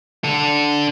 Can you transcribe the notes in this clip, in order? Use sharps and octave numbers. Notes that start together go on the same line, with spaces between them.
D3 A4